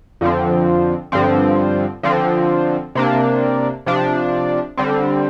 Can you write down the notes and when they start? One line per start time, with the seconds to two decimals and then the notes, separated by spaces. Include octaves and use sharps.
0.21 F2 D3 F3 C4
1.12 G2 D3 F3 C4
2.03 D3 F3 C4
2.95 C3 A#3 D4
3.86 C3 F3 D4
4.77 D3 G3 C4